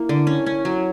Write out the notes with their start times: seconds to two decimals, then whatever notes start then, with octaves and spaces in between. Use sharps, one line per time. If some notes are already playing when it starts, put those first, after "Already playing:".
Already playing: A#3 E4
0.09 D3
0.27 C#4
0.46 C#4
0.65 F#3